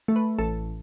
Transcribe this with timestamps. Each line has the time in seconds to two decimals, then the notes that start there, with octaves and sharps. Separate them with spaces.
0.08 A3
0.16 B4
0.38 A1 A4